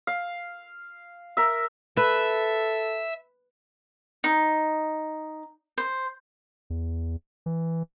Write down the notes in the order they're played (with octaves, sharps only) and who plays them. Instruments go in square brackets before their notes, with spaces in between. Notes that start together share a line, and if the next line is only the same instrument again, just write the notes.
[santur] F5
A#4 E5
[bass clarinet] A4 [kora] B4 [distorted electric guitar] E5
[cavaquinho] D#4
C5
[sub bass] E2
E3